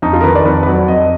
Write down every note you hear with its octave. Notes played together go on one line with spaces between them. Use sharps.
F2 D#4
F4
A#4
D#3 B4
D5
F2 B4
B4
F#3 D5
F2 D#5